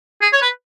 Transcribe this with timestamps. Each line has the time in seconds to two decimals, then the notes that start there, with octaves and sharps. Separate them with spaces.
0.22 G#4
0.33 C#5
0.42 B4